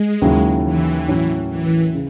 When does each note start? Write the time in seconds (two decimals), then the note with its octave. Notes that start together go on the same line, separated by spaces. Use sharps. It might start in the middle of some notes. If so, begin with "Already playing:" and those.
Already playing: G#3
0.22 D#2 C#3 F#3 C#4 E4
0.65 E3
1.08 A2 F#3 C#4
1.50 E3
1.94 C#3